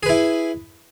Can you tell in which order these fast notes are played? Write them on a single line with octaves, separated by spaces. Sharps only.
G#4 B4 E4